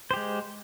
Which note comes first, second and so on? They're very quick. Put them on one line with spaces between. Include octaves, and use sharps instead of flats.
C5 G4 G#3